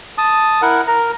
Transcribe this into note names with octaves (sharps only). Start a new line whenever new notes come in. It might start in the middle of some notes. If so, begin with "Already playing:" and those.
A5 D#6
E4 A#4 F#5
A#4 A#5